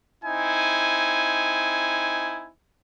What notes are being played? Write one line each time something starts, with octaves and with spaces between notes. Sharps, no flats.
C4 D#4 E4 G#5